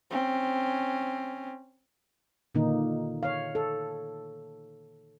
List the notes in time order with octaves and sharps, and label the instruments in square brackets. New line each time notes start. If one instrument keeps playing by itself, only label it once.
[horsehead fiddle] C4 C#4
[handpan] A#2 D3 D#3 A#3 D#4
C#5 F5
A4